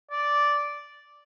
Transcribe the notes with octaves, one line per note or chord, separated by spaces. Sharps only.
D5